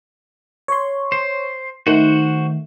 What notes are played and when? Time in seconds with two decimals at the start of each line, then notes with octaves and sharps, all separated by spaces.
0.68 C#5 C6
1.12 C5
1.87 D#3 A3 F#4 C5 F#5